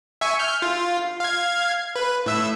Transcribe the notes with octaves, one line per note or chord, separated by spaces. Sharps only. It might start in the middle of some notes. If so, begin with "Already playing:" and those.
E5 G#5 C#6
F6 G6
F4
F5 G#6
B4
A2 E5 E6